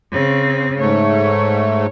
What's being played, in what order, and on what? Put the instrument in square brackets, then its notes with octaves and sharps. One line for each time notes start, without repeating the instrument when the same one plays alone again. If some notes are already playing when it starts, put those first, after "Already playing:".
[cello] C#3 C4
[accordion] G#2 A3 [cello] C#5